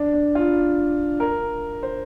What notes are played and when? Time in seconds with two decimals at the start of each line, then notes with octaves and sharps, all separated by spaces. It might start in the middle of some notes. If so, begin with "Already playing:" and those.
Already playing: D4
0.14 D4
0.35 F4
1.20 A#4
1.83 C5